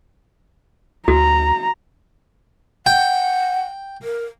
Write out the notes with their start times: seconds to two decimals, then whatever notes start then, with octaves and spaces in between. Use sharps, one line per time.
1.08 D2 F#4 A#5
2.86 F#5 G5
4.02 A#4